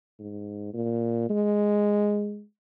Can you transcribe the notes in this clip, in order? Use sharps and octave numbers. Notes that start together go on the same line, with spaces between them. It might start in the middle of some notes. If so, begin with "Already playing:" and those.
G#2
A#2
G#3